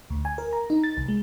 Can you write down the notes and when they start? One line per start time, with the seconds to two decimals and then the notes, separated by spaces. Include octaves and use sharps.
0.10 D2
0.25 G#5
0.38 A#4
0.53 A#5
0.70 D#4
0.84 A6
0.97 C2
1.08 G#3